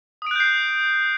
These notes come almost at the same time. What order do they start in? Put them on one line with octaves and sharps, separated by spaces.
D#6 D7 F#6 G6 C7